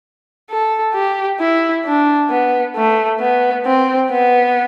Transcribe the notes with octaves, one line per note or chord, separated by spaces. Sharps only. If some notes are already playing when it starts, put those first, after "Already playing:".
A4
G4
E4
D4
B3
A3
B3
C4
B3